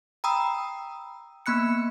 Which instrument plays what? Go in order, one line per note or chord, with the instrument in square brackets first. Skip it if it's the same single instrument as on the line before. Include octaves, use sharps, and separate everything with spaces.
[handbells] G5 A#5 B5 D#6 E6
A#3 B3 B5 F#6 C#7